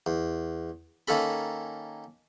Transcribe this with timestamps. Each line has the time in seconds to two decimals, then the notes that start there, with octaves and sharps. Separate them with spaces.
0.06 E2
1.08 D#3 A#3 C#4 A4 B5